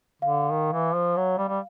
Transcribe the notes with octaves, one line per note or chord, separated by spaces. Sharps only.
D3 F5
D#3
E3
F3
F#3
G3
G3